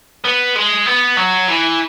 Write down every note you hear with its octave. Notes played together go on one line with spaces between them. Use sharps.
B3
G#3
B3
F#3
E3